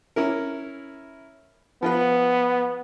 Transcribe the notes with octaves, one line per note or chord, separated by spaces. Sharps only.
C#4 E4 A#4
F3 B3 F4 B4